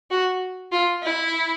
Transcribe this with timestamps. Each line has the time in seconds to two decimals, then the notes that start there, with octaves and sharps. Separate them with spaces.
0.11 F#4
0.72 F4
1.03 E4